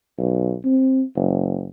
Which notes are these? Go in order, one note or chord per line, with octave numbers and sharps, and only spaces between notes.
B1
C4
F#1